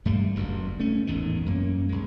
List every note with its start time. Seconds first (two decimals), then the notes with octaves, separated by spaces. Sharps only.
0.05 G2 G3 A3 A#3
0.35 F#1 D2 G2
0.79 A3 C#4
1.07 G#1 E2 A2 D#3
1.46 F#2 A#3 C#4
1.89 A#1 G2 G#3